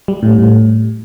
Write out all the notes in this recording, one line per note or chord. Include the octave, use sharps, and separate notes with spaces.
G3
A2
A2